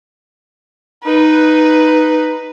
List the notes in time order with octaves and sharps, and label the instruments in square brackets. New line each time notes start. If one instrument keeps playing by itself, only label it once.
[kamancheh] D#4 B4